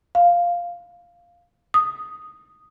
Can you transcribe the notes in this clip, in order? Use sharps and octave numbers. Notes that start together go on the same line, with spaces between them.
F5
D#6